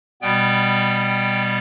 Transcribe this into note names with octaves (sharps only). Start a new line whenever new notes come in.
B2 G3 B3 G5
G5